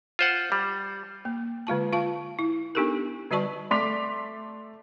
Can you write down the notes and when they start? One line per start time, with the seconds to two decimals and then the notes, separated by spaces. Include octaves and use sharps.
0.19 F4 C5 F#5
0.52 G3
1.25 A#3
1.67 D3 G#3 F4 A5
1.93 F4 F5 A5
2.39 E4
2.75 B3 D4 D#4 G4 A4 A#4
3.31 D3 G3 F#4 D5 A5 C#6
3.71 A3 D5 C6 D6 B6 F7